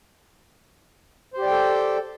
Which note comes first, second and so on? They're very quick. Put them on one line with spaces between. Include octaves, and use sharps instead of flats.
C5 G4 D5 G5 A4